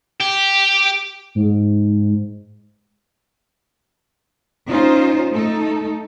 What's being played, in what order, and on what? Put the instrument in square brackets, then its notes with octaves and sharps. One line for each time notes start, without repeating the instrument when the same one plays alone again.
[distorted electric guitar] G4
[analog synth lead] G#2
[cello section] C#4 D#4 F4 C5
A3 D#4 A4